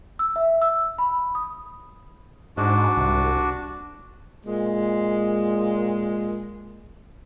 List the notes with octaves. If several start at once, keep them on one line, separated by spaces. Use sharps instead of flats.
E6
E5
E6
B5
D#6
G#2 D4 F#4
C2
A#2 G#3